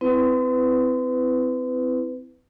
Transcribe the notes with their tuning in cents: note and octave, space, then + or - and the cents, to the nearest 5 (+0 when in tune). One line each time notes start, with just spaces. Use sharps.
C4 -30 E4 +0 B4 +25